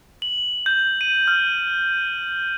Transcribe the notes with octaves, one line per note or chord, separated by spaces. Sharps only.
F#7
G6
D#7
F6